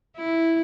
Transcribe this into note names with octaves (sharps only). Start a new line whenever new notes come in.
E4